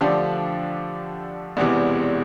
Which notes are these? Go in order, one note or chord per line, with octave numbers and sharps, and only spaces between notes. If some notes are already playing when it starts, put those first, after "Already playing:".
D3 F3 A3 D4 G4
E1 E2 C3 E3